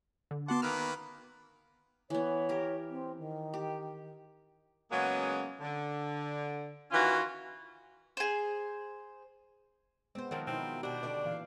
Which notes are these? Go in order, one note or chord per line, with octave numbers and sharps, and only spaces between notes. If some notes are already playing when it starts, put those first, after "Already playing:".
D3
B3 F#4 F#5 A5 C6 D6
D#3 A#3 B4 D6 E6 F6
E3 B3 C#5
G4 A#4
C4
D#3
G4
C#3 F#3 G#3 A#3 B3 C#4
D3
D#3 E3 C#4 F4 F#4
G#4 C5
G#3 B3 C4 C5
D#3 F3 F#3 B3 C4 A#4
B2 C4 D#4 E4
B2 D4 F#4 G4
D3 D5
A#2 E3 F5